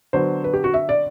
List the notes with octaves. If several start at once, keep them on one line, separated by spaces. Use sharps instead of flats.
D3 F#3 B3 C5
B4
G4
F#4
E5
D5